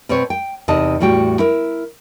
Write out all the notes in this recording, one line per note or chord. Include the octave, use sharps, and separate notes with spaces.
B2 C4 B4 C#5
G5
E2 C3 D#4 D#5 A5
E2 A2 G3 F#4 G5
E4 A#4